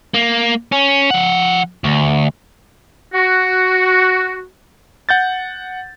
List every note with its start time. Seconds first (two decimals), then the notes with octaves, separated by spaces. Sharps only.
0.14 A#3
0.72 C#4
1.11 F3 F#5
1.84 D2
3.14 F#4
5.09 F#5 G6 A6